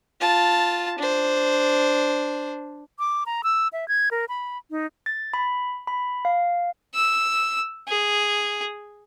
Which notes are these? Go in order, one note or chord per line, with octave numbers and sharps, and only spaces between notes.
F4 A5
D4 C5
D6
A#5
E6
E5
G#6
A#4
B5
D#4
A6
B5
B5
F5
E6
G#4